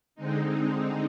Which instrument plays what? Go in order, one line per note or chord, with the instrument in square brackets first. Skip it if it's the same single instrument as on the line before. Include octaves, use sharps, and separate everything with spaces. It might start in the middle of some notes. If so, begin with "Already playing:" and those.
[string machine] D3 G#3 C4 D#4